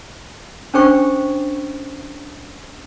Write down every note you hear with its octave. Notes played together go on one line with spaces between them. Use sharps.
C#4 D4 G#4 C5 G5 C#6